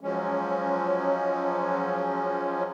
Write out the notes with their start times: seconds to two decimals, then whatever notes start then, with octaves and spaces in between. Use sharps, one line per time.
0.01 F3 F#3 G#3 C#4